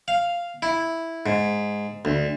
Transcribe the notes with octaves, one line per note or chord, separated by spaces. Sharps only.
F5
E4
G#2
D2